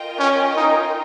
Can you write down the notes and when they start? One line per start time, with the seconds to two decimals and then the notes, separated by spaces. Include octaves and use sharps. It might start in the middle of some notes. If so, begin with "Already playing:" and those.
Already playing: F4 A#4 D#5 G5
0.19 C#4
0.57 D#4